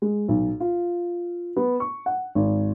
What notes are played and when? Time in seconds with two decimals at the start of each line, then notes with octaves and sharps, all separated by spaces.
0.02 G#3
0.28 B1
0.60 F4
1.56 B3
1.80 C#6
2.06 F#5
2.35 G#1